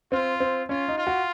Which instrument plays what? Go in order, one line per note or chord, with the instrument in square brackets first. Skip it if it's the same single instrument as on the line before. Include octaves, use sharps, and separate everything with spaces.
[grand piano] C4 [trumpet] F4
[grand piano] C4
[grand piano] C#4 [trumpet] F4
[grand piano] D#4
[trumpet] F4
[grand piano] F#4